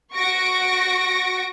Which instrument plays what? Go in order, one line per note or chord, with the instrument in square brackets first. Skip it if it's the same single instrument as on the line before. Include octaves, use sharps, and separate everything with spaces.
[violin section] F#4 C#6 A#6 D7